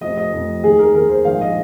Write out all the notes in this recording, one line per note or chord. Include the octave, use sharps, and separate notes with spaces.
F1 F2 F3 D#5
D#5
F1 F2 F3
D#2 D#3 G#4
A#4
D#2 D#3 A#4
C5
A#1 G#2 D#3 F5
D#5